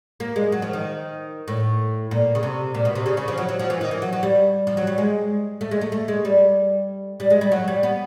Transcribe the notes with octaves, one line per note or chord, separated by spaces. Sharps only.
A#3
G#3
F#3
F3
D#3
A2
A#2
C#3
C3
A#2
B2
C3
C#3
C#3
F3
F#3
F#3
F3
E3
D#3
E3
F#3
F#3
G3
F3
F#3
G3
G#3
A3
G#3
A3
A3
G#3
G3
G3
G#3
G3
F#3
G3
B3